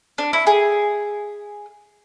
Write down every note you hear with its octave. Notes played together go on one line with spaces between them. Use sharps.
D4
E4
G#4